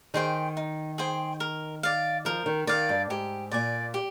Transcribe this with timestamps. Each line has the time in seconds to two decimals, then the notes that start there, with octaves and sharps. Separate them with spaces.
0.14 D#3 G#4 C5 G5
0.57 D#4
0.98 G#4 C5 G5
1.40 A#4
1.83 D5 F5
2.25 F3 A#4
2.46 D#3
2.67 D#3 D5 F5
2.89 G2
3.10 G#2 G4
3.51 A#2 D5 G#5
3.94 G4